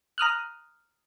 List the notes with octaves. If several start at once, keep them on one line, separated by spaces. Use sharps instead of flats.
A#5 D#6 F6 F#6